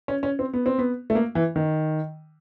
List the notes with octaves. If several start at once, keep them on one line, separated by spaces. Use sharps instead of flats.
C#4
C#4
C4
B3
C4
B3
A3
A#3
E3
D#3